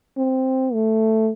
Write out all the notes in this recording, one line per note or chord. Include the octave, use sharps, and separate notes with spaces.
C4
A3